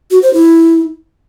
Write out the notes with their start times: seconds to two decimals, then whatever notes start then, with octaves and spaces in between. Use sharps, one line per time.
0.11 F#4
0.22 C5
0.34 E4